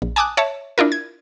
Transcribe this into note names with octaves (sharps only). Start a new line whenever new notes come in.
A#1
G#5 A5 D6 D#6 F#6
C#5 E5 A5
D4 E4 F4 A#4
G#6